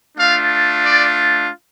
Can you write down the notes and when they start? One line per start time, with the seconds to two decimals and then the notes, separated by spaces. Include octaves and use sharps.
0.17 A3 D4 F4 F5
0.82 D5